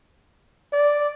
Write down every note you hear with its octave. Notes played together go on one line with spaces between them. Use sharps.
D5